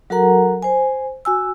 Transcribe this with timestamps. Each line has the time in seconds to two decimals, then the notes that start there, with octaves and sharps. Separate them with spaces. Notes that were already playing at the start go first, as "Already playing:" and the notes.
0.10 F#3 F#4 A4 A#4 F#5 A#5
0.63 C5 G#5
1.25 F#4 G#5 E6